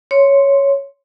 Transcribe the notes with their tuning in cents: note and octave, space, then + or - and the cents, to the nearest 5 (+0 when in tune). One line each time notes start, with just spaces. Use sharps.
C#5 +0 C6 +0